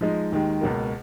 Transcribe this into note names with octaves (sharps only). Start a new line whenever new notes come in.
F3 G#3 D#4
D#2 D#3 G#3
C#2 B2 A#3